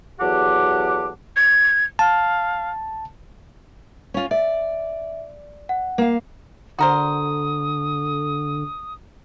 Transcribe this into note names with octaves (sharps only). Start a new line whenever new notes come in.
E2 F#3 G4 A4 F#5 D6
G#6
F5 A5
C#4 F4
D5 E5
F#5
A#3 F5
D3 F#4 A#4 C5 D#6